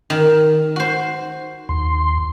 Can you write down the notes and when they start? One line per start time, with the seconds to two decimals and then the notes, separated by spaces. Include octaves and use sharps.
0.10 D#3
0.76 F#4 C5
1.69 D#2 C6